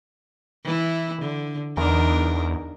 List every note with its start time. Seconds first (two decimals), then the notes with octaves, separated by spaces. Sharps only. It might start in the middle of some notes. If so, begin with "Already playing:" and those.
0.64 E3 E4
1.21 D3
1.77 E2 D4 D#4 A#4